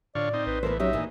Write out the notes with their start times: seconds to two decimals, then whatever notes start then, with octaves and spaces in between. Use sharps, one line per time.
0.15 A2 D3 F4 C#5 D5
0.33 C4 D#4
0.46 A#1 B4
0.63 A2 E3 B3 A#4 C5
0.80 F#3 C#4 D#4 G4 E5
0.93 A#2 E3